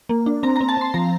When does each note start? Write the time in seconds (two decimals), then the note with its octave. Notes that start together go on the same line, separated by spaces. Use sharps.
0.09 A#3
0.26 D4
0.43 C4 A#5
0.56 A#5
0.61 C4
0.69 A5
0.77 C4 C6
0.94 F3 A#5